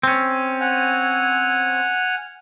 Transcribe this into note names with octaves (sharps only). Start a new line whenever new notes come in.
C4 C#4
F#5 G#5 F6